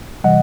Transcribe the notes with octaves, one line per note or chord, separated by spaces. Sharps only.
C3 E3 G3 D#5 F#5